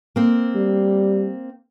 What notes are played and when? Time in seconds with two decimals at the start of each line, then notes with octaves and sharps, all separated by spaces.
0.16 A#3 C4
0.55 G3